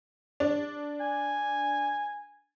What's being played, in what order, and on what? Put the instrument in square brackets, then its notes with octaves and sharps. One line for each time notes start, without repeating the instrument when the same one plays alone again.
[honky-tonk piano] D4
[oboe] G#5